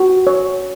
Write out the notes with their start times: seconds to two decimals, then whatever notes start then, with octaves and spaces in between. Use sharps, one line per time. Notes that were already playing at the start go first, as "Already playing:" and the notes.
Already playing: F#4
0.27 C#5